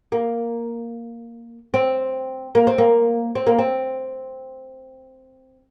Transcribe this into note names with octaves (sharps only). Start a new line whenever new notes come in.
A#3
C4
A#3
C4
A#3
C4
A#3
C4